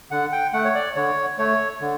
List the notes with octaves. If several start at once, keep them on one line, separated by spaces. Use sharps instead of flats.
D3 F#5
G5
A3 F#5
C#5
D5
D3 C#5
A3 C#5
D3